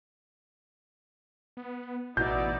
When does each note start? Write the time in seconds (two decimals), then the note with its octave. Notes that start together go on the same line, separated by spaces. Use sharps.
1.57 B3
2.17 A1 B2 D#4 E4 D5 G6